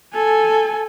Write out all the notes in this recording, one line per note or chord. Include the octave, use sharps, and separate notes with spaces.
A4 G#5